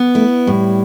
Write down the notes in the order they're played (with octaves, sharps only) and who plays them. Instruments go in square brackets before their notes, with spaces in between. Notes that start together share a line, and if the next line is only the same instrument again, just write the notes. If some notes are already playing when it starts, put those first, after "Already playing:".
Already playing: [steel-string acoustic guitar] B3
[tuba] A3 [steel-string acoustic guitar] E4
[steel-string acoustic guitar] A2 [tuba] G3